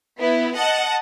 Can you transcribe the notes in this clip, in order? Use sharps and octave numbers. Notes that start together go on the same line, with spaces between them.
B3 E4
D#5 F#5 A5